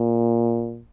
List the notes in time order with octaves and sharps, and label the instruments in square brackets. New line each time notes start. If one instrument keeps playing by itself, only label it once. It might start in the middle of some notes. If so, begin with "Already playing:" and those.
Already playing: [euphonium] A#2